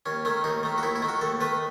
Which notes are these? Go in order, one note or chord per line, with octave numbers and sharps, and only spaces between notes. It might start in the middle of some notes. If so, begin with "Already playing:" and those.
D#2 C#4
D#3 A3 C#4
D#2 D#4
D#3 A3
F#4
D#2 E4
E4
D#3 A3
F#4
D#2 A4
D#3 A3 B4